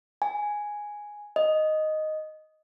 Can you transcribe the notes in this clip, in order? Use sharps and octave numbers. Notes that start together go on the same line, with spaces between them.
G#5
D#5